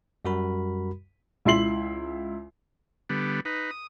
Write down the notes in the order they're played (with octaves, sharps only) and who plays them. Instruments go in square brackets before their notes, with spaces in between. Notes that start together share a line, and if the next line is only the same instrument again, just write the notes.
[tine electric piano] F#2 G3 F#4 A#4 B5
[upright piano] C#2 E4 E5 C6 C7 F#7
[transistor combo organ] D3 G3 B3
D#4 B4
D#6